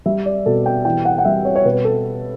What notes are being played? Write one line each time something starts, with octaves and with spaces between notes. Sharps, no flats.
G3 E5
D5
B2 A4
G5
E3 G5
F#5
F#5
G3 E5
C#5
C#5
B2 B4
A4